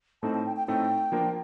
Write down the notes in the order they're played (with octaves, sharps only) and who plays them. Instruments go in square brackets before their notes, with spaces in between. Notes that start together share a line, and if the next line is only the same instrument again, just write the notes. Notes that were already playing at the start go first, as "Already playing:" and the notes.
[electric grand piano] A2 A3 C4 D#4 A4 [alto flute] A5
[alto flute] A5
G5
G5
[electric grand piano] A2 A3 C4 D#4 A4 [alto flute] G5
[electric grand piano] F3 A#3 D4 F4 A#4